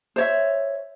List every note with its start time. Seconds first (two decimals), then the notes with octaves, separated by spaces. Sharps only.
0.16 C5 C#5 E5